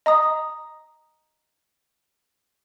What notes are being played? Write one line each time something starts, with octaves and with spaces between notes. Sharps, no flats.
D#5 A#5 D#6